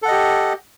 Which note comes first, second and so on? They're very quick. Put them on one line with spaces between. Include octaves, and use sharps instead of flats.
A4 F#5 D#5 G4